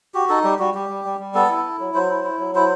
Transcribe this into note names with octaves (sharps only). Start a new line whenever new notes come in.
F#4 G4
D#4 A4
G3 G4
G3 F#4
G3 G4
G3
G3
G3
B3 A4
E4
E4
F#3
F#3 C5
E4
E4
F#3
E4 C5